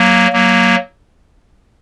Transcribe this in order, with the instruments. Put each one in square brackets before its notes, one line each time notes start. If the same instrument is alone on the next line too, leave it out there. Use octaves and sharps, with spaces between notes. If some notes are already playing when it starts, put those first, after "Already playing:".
Already playing: [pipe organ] F#3 A#3
F#3 A#3